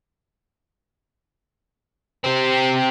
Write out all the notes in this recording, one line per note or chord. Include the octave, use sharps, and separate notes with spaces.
C4 G4